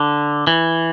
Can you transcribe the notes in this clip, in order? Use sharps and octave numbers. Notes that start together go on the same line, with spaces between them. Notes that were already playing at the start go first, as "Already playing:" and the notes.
Already playing: D3
E3